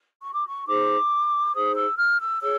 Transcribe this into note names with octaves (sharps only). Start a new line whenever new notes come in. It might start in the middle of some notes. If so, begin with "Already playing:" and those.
C#6
D6
C#6
D#4 G#4 C5 D6
D#4 G#4 C5 D#6
E6
F6
E6
G#4 C#5 E6